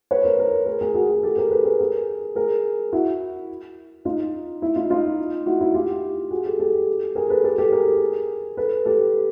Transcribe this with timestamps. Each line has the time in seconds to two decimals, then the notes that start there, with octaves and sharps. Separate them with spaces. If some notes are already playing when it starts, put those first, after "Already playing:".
0.11 B4 C#5
0.24 A#4 C5
0.39 A#4 C5
0.66 G#4 A#4
0.81 G#4 A#4
0.94 F#4 G#4
1.09 F#4 G#4
1.23 G4 A4
1.37 G#4 A#4
1.51 A4 B4
1.65 G#4 A#4
1.80 G#4 A#4
2.36 G#4 A#4
2.93 E4 F#4
4.05 D#4 F4
4.62 E4
4.75 D#4 F4
4.90 D#4 F4
5.46 E4 F#4
5.61 E4 F#4
5.74 F4 G4
6.31 F#4 G#4
6.45 G4 A4
6.59 G4 A4
7.15 G#4 A#4
7.30 A4 B4
7.44 G4 A4
7.58 G4 A4
7.72 G#4 A#4
8.57 A4 B4
8.85 G4 A4